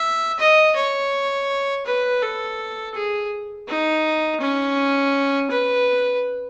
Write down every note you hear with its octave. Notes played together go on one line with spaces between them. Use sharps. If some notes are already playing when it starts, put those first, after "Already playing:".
Already playing: E5
D#5
C#5
B4
A4
G#4
D#4
C#4
B4